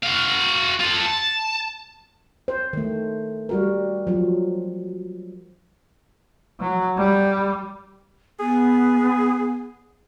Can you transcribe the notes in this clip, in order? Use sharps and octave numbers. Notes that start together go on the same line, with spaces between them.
F#4 F5
F4 A4
A5
C5
D#3 A3
G3 F#4 A#4
F3 F#3
F#3
G3
B3 G#4